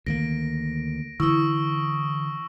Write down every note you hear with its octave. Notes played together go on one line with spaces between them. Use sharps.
D2 D#3 A#3 A#6 D7
D3 E3 E4 C#6 D#6 E6